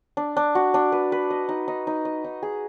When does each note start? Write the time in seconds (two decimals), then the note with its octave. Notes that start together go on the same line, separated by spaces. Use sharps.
0.17 D4
0.37 D4
0.55 F#4
0.74 D4
0.92 B4
1.12 B4
1.30 D#5
1.49 D#4
1.68 D#4
1.87 D#4
2.05 D#5
2.24 D#4
2.43 G#4